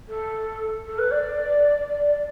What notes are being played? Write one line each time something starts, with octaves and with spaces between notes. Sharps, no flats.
A4
A4
B4
D5